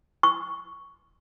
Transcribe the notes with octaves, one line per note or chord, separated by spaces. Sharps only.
C#6